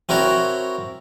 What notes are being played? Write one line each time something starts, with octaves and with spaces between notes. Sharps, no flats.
C4 E4 F#4 A#4 C#5